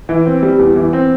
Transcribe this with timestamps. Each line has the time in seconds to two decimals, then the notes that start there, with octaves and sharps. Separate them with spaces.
0.09 E3
0.26 C4
0.43 G3
0.59 E2
0.76 E3
0.93 C4